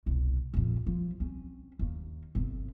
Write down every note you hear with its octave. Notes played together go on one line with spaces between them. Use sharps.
E1 C2
A#1 F2
F3
C4 C#4
D#2 A#3
G1 C3